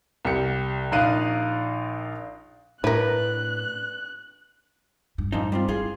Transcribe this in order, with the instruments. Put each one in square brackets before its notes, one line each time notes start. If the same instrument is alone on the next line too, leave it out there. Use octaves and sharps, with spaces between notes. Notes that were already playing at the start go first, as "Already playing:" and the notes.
[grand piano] C2 G4 C#7
A#1 D#4 D5 F5 F#6 D#7
[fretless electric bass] A2 [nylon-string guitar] D4 B4 [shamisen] E4 A#4 [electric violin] F#6
[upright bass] G2
[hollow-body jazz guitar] A#2 F3 D#4
G3 C4 F4
[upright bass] E4 [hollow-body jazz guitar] F4 G#4 F5